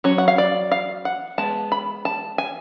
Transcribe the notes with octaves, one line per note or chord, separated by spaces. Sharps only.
F#3 C#4 C#5
F#5
F5
D5
F5
F#5
G#3 B3 A5
B5
A5
G#5